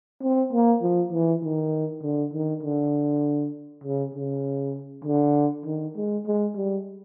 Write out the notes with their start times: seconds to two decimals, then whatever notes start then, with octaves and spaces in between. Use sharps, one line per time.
0.22 C4
0.53 A#3
0.83 F3
1.13 E3
1.44 D#3
2.03 D3
2.34 D#3
2.63 D3
3.84 C#3
4.15 C#3
5.05 D3
5.66 D#3
5.96 G#3
6.26 G#3
6.56 G3